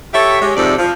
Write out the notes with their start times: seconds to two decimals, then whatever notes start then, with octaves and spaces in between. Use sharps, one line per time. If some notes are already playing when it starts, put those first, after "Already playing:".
0.13 G4 A4 C#5 E5
0.41 G#3 G4 C#5
0.56 F2 G#2 C3 A4 C5 D5
0.77 F3